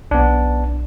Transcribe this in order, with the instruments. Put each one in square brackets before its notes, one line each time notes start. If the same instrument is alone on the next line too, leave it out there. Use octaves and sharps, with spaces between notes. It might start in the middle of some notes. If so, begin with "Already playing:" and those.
[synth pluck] B1 [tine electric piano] B3 D4